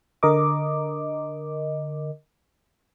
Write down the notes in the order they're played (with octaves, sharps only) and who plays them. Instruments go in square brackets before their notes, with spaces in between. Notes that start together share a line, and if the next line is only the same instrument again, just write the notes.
[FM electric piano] D3 A#4 D#5 D6